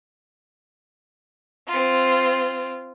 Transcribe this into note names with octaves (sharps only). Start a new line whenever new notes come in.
C4 F4